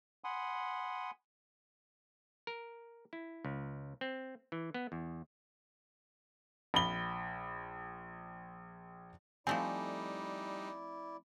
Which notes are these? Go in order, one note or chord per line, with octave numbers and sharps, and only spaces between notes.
F#5 G#5 B5 C6 D#6
A#4
E4
C#2
C4
E3
B3
E2
A#1 B5 G7
F3 G3 A3 C4 D#4 E4 D5 G#5